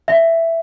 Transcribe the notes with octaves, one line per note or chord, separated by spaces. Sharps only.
E5